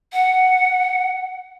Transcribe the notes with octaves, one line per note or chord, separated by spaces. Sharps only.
F#5